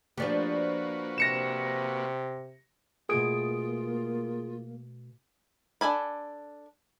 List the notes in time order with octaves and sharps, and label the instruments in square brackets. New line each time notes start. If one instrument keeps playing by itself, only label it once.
[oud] F3 D4 G4 [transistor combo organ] A#3 F#4 B4
[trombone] C3 [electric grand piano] A#6 C#7 E7
[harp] B2 A3 G#6 [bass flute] A#3 [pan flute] F4 [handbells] G#4 D#6 D7
[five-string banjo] D4 A4 G#5 B5